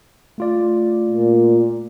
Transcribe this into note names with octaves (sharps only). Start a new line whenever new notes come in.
A3 F4 D5
A#2